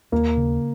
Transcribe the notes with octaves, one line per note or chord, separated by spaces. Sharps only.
D#2 A#3
C#3